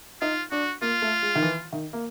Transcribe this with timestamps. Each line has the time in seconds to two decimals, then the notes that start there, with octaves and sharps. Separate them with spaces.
0.21 D#4 F4
0.51 D4 F#4
0.82 A#3 F4
1.02 A3
1.22 G#3
1.35 D#3
1.42 E3
1.73 D#3
1.93 A#3